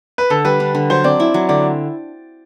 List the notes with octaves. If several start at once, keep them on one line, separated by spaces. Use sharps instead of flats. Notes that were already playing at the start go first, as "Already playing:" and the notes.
B4
D3 A4
G3 B4
D4
D3
F#3 C5
C4 D5
E4
F#3
D3 D5